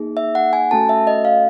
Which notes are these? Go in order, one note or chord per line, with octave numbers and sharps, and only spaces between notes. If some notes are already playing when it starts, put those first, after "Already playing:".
Already playing: A#3 D#4 G#4
E5
F#5
G#5
A3 C#4 F#4 A4 A5
E5
D#5
F5